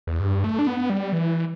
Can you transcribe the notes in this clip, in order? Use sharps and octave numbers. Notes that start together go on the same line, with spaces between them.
E2
G2
A3
D4
B3
G3
E3